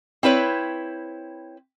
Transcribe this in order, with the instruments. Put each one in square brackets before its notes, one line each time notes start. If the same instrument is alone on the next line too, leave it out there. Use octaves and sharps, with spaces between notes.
[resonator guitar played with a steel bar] C4 E4 B4 C#5